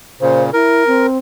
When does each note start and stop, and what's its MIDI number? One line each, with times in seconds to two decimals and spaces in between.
0.21 0.50 46
0.21 0.50 49
0.21 0.43 72
0.53 0.84 64
0.53 1.07 70
0.87 1.18 60